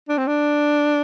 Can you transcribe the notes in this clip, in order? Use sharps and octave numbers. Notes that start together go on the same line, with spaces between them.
D4
C4
D4